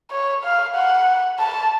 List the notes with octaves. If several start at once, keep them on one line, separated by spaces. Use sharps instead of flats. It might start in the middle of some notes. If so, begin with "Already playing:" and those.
C#5
F5
F#5
A5